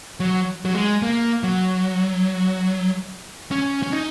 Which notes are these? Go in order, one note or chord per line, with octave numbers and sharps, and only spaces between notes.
F#3
F#3
G#3
A#3
F#3
C#4
C#4
D#4